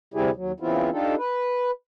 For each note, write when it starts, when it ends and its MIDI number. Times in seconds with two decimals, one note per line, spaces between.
0.14 0.30 38
0.14 0.30 48
0.14 0.30 55
0.14 0.30 64
0.14 0.30 67
0.14 0.30 68
0.36 0.52 39
0.36 0.52 54
0.60 0.90 49
0.60 0.90 52
0.60 0.90 59
0.60 0.90 60
0.60 0.90 64
0.60 0.90 65
0.92 1.15 62
0.92 1.15 63
0.92 1.15 65
0.92 1.15 67
0.92 1.15 69
1.18 1.71 71